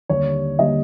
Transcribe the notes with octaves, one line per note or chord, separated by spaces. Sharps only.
D#2 D3 G3 A#3 D4 C#5
D3 G3 A#3 D4 D#5